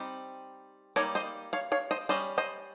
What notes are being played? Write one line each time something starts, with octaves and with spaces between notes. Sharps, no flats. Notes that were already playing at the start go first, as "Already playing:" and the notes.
Already playing: G3 C4 D#4
G3 A#3 D#4 A#4 C#5
C5 D#5
C#5 F5
C#5 F5
C5 D#5
G3 C#4 C5 D#5
C5 D#5